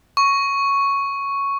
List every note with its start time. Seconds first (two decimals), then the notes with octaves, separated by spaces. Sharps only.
0.17 C#6